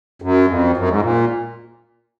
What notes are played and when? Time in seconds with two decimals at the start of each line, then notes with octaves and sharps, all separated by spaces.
0.22 F#2
0.48 F2
0.77 F#2
0.89 G#2
1.02 A#2